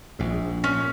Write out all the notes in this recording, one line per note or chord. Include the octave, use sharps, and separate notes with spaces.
A#1 G#2
A#2 C#4